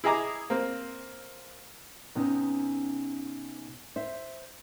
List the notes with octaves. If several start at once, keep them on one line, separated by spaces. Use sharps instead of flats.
E4 G#4 D#5 G#5 A#5 D6
A#3 C4
C3 B3 C#4 D#4
C5 E5